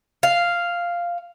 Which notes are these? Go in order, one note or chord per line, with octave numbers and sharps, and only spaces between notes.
F5